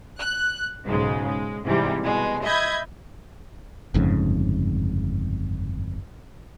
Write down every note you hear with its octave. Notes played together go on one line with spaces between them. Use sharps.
F#6
B1 G#2 C#3 G#3
G#3
G#2 C3 E3 G3
B2 G#3
D#5 E5 B5 G6 G#6
G1 F2 G#2 C#3